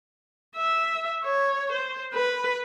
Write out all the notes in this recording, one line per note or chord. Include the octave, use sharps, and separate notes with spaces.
E5
C#5
C5
B4